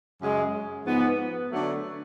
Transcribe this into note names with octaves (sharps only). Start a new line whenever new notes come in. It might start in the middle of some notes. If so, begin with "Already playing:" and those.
F#2 C#3 G#3
G#2 F3 B3
D3 F#3 A3